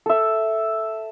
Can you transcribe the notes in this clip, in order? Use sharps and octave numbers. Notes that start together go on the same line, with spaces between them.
A4 E5